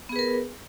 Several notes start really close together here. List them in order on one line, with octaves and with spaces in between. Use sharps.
B3 G#4 B4 A#4